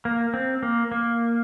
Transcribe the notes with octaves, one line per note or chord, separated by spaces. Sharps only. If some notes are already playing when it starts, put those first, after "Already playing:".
A#3
C4
A#3
A#3